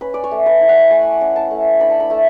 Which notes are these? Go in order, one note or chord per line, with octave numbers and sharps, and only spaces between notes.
C#4 B4
D5
C#5
A3
B4
E4
F#5
A3 G#5
C#4
A5
A3
D4 B5
A5
B5
A3 A5